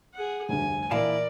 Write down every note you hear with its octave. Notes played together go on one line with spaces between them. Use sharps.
G#4 F#5
F1 D2 G2 G#5
A#2 E3 E4 A#4 D5 F5 A5